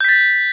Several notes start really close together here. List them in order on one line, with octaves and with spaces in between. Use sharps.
G6 B6 A6